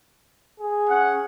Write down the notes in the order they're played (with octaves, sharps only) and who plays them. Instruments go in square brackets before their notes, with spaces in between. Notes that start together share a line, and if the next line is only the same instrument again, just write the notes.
[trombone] G#4
[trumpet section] C#4 F#5